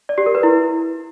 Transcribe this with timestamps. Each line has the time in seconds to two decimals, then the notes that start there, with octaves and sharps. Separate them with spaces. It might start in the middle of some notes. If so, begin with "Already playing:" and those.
0.09 D5
0.18 G4
0.26 A#4
0.35 B4
0.43 E4